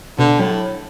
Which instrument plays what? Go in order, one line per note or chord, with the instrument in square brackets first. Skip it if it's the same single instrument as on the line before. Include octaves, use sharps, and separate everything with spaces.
[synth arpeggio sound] B2 [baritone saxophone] D3
[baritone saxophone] A2 [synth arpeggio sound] F#3